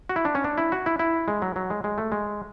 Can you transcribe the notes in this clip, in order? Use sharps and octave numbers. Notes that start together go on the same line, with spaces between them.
F#4
E4
D4
C#4
D4
E4
F#4
E4
E4
G#3
F#3
F#3
G#3
G#3
A3
G#3